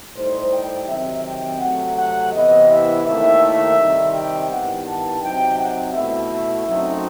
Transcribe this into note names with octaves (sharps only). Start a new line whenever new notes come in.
A2 G3 D#4 C5
G5
C3 D#3 F#3 C4 E5
G5
C3 F#3 A3 F#5
F#5
C3 E3 B3 E4 D#5
E5
D#2 D#3 A3 E4 E5
C3 D#3 G3 C4 D#4
G5
G2 D#3 G3 B3 E4 F#5
A5
C3 F#3 C4 D#4 G5
F#5
B2 A3 E4 E5
F#2 F#3 A3 C4 D#4